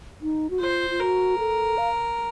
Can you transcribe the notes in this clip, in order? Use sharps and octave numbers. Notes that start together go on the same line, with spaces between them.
D#4
F#4
F4 C5
F4
F#4 A#4
A4
F5